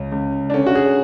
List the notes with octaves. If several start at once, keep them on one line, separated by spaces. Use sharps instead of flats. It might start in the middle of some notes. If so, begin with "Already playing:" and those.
Already playing: C#2 C#4
C#2
D4
D3 C#4
F#4
G#4